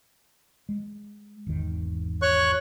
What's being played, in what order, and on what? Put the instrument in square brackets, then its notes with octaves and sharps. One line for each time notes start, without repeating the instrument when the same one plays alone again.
[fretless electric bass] G#3
G#1 E2 D#3
[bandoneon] C#5 C#6 F#6